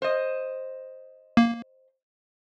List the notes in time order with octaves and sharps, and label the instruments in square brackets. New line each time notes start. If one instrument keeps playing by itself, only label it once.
[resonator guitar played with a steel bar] C5 D#5
[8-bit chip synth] A#3